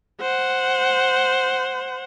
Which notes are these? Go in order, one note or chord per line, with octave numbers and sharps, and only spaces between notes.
C5 F#5